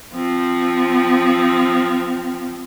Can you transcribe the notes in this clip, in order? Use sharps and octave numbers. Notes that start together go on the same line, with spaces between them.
F3 C4